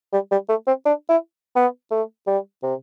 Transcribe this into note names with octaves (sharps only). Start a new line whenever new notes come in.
G3
G3
A3
C4
D4
E4
B3
A3
G3
C3